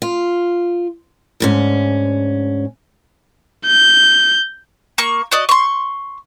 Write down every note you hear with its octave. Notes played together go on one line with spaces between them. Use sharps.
F4
D2 G#2 C#4
G6
A#3 C#6
F#4 D5 D#5
C6 C#6